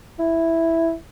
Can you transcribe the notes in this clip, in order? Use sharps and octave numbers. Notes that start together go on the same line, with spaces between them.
E4